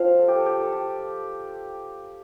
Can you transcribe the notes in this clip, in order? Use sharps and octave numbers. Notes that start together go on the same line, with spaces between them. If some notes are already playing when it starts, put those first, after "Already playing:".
Already playing: F3 F4 F5 G5 A5
A4
G4
A4
G4
A4
G4